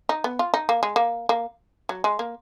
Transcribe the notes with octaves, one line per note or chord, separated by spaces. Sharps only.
D#4
B3
F4
D#4
A#3
G#3
A#3
A#3
F#3
G#3
A#3